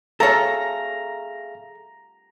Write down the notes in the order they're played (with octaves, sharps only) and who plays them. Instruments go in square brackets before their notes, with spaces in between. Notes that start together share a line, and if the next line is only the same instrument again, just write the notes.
[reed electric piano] G#4 E5 F5 [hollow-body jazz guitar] A4 C#5 [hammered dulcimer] A#5